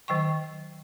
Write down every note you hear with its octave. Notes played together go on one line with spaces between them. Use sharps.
D#3 F#3 G5 C#6